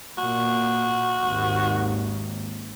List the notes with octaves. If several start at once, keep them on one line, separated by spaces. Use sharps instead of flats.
A#2 F#4
G#1 D#2